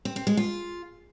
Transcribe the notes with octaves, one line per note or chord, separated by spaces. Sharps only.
C4
C4
G#3
F4